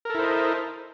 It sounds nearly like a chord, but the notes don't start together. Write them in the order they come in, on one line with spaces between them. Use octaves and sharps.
A#4 A4 E4 C5 D#5